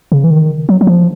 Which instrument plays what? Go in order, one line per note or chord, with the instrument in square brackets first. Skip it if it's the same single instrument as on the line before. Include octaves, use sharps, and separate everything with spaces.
[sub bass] C#3
E3
D#3
F#3
F#3
F3